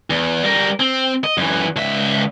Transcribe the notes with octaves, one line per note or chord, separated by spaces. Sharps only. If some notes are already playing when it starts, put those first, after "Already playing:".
E2
G3 A#4
C4
D#5
F#2 E3
C#2 E5